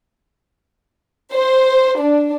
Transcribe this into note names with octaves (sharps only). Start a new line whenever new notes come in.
C5
D4